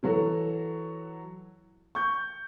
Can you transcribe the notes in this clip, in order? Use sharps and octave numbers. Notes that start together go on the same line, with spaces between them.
E3 F#3 F#4 A4
C#6 G6